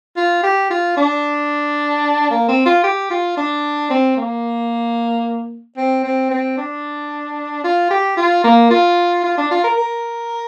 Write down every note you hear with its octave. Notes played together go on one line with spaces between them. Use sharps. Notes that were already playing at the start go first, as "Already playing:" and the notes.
F4
G4
F4
D4
A#3
C4
F4
G4
F4
D4
C4
A#3
C4
C4
C4
D4
F4
G4
F4
A#3
F4
F4
D4
F4
A#4
A#4